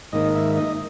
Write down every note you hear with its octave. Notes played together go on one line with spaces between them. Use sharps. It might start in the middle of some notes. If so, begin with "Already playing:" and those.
G#2 D#3 A#3 D#4 D#5
E5
D#5